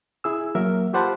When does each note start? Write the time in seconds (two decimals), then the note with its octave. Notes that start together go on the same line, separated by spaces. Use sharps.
0.24 E4 G#4 E6
0.55 F#3 A#3 A#4 E5
0.93 F4 G4 C5 F#5 A5 B5